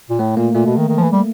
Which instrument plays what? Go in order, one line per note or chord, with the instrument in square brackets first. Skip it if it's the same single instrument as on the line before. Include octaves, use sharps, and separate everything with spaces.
[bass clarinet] A#2
[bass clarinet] A2 [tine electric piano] A3
[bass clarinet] A#2 [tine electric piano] A#3
[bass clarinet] A#2 [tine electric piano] A3
[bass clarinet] B2
D#3
D#3
F3
E3
G3